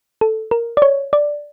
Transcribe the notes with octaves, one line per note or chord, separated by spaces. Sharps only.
A4
A#4
D5
C#5
D5